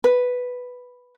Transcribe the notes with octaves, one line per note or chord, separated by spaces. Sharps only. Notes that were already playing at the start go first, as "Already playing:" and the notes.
B4